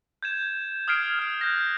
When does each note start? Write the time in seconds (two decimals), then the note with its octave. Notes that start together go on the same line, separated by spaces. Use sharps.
0.23 G6 G#6 E7
0.88 D#6 F6 G#6 C7 D7
1.19 F6 D7
1.41 F#6 G6 A#6